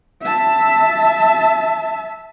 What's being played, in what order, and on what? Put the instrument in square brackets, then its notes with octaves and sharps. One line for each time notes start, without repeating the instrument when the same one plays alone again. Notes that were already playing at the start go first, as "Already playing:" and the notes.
[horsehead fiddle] E5 A5